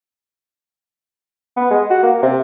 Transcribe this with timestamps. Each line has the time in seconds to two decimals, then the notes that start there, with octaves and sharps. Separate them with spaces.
1.57 B3
1.70 G#3
1.90 F#4
2.03 A#3
2.22 C3